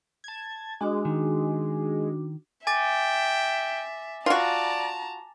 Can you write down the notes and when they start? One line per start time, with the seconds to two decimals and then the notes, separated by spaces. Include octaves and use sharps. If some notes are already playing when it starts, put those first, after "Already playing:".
0.24 A5 G#6
0.81 G#3 D4 F#4 D6
1.05 D#3
2.67 E5 G5 G#5 D6 A6
4.26 F4 F#4 D5 A5 A#5